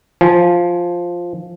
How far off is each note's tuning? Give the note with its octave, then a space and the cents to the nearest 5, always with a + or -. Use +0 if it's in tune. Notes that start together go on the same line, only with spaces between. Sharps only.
F3 +0 G#5 +15